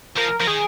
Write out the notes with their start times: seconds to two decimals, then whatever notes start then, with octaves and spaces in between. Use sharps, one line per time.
0.17 F3 A#4
0.40 F3 A#4
0.47 D#3 G#4